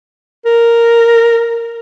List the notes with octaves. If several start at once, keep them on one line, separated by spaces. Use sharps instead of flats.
A#4